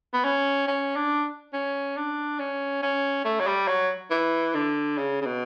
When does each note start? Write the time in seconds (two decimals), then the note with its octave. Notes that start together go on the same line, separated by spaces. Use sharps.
0.13 B3
0.24 C#4
0.68 C#4
0.96 D4
1.53 C#4
1.96 D4
2.39 C#4
2.82 C#4
3.25 A3
3.40 F#3
3.47 G3
3.68 F#3
4.11 E3
4.55 D3
4.98 C#3
5.21 C#3
5.26 B2